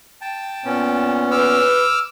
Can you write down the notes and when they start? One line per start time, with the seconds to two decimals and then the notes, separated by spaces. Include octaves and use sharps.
0.21 G5 A5
0.65 A#2 B3 C#4
1.31 B4 D6 E6 F6